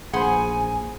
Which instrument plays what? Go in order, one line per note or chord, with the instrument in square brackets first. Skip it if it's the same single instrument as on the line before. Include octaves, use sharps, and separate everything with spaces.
[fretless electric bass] A#1 [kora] G#4 C5 [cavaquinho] F#5 B5 C6 [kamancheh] G#5